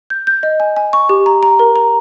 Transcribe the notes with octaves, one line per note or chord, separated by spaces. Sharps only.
G6
G6
D#5
G#5
G#5
C#6
G4
A#5
A#5
A#4
A#5